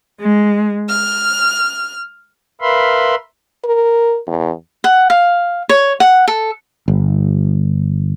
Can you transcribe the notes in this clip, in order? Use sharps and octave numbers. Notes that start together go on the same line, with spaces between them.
G#3
F6
A#4 B4 E5 F5 B5 C6
A#4
E2
F#5
F5
C#5
F#5
A4
G1